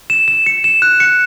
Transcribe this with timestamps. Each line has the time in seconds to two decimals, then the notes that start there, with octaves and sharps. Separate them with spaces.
0.10 E7
0.28 E7
0.46 C#7
0.64 E7
0.82 F#6
1.00 C#7